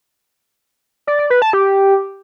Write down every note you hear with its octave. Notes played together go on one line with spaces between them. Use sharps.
D5
D5
B4
A5
G4